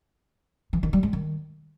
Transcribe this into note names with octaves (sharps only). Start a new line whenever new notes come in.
E3
D#3
G3
G#3
D#3